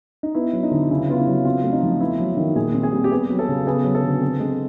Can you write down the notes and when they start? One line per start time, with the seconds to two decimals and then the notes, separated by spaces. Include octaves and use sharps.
0.23 D#4
0.35 B3 E4
0.53 F#3
0.63 D#4
0.72 D3
0.90 C#3 E4
1.09 B3 F4
1.18 E4
1.27 F#3
1.45 C4 F4
1.63 A3
1.72 D#4
1.83 F3
2.00 B3 E4
2.20 F#3
2.37 D#3
2.56 A#2 G#4
2.74 C4
2.83 G#4
2.92 G3
3.04 G4
3.11 B3 G#4
3.30 F#3
3.39 A4
3.49 C#3
3.67 B3 G#4
3.84 F#3
3.95 A4
4.03 D3
4.22 C4
4.40 G#3